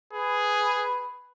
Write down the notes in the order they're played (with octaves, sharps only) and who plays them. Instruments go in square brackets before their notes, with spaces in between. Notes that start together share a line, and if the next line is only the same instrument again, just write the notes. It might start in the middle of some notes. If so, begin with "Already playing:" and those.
[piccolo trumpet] G#4 [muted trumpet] B4